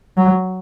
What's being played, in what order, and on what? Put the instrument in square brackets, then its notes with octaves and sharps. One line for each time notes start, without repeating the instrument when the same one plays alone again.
[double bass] F#3